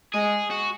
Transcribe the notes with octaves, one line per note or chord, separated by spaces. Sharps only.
G#3 G#4
F#4